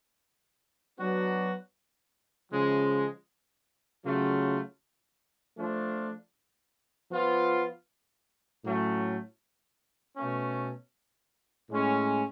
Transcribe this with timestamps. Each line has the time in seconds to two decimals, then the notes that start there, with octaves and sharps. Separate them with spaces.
0.98 F#3 B3 D4 F#4
2.52 C#3 F3 G#3
4.05 C#3 F#3 A3 F4
5.57 F3 A3 D4 F4
7.11 F3 B3 F4
8.63 A2 F#3 A3 C#4
10.16 B2 A3 C#4
11.70 A2 G#3 C#4